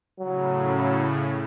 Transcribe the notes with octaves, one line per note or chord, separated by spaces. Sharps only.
A2 C#3 F#3